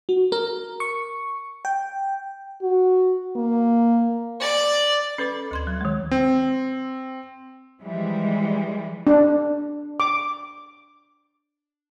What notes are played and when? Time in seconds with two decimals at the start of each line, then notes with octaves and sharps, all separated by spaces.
0.09 F#4
0.32 A#4
0.80 C#6
1.65 G5
2.62 F#4
3.36 A#3
4.40 D5
5.18 C#4 A4 B4 D5 B5 D6
5.51 D2 C6 G#6
5.67 F#3
5.81 D#3 G#3
6.11 C4
7.82 E3 F3 G3 G#3
9.07 D4
10.00 D6